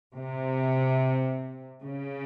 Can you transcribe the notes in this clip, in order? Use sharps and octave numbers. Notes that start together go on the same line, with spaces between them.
C3
C#3